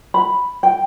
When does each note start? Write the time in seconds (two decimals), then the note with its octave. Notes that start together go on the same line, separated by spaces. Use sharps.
0.14 B5
0.63 G5